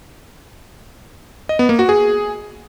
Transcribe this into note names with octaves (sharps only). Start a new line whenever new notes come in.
D#5
B3
A#3
F#4
G#4